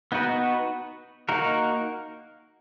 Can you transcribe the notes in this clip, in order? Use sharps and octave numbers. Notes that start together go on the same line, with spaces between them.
B3 D#4 F#4 B4
A#3 D#4 F#4 A#4